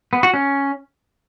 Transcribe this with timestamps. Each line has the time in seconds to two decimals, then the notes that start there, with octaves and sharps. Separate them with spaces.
0.13 B3
0.23 F#4
0.34 C#4